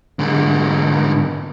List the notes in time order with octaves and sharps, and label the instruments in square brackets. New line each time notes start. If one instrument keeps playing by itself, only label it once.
[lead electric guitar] G#2 D3